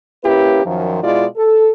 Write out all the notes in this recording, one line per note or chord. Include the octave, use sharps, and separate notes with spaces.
A#3 C#4 E4 G4 B4
F#2 D#3 F3
B2 G#3 E4 F4 D5
A4